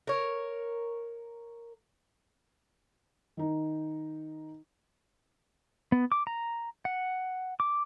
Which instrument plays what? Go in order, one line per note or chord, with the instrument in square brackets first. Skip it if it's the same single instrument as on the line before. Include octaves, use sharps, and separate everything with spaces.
[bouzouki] A#4 C#5
[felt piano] D#3 D#4
[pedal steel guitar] B3
D6
A#5
F#5
D6